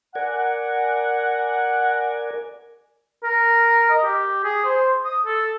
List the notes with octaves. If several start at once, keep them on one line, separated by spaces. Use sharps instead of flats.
A#4 D5 F#5 G#5
A#4
D#5
G4
G#4
C5
D#6
A4